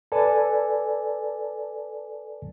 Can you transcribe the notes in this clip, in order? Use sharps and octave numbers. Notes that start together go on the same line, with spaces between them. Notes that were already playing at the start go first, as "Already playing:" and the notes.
A4 B4 D5 G#5 A5